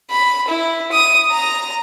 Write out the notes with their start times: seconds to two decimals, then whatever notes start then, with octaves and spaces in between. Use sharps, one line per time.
0.11 B5
0.48 E4
0.92 D#6
1.31 A#5